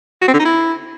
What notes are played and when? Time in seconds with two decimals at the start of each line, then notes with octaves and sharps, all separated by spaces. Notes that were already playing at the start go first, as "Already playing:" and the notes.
0.22 F#4
0.28 C4
0.34 D3
0.39 D#4
0.45 E4